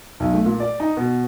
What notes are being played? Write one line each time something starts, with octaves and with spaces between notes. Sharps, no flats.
B1
A3
A#2
D5
D#4
B2